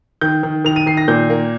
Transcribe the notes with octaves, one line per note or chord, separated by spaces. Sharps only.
D#3 G6
D#3
D#3 F7
D#7
D#3 C7
A#6
A#2 G6
A#3